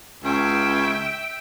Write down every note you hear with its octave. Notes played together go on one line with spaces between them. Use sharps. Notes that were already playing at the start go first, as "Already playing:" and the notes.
C#2 C#4 E5 G5